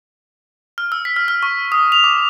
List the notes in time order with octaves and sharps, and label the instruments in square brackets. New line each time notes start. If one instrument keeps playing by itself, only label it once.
[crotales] F6
E6
B6
F6
F6
C#6
D#6
F7
D6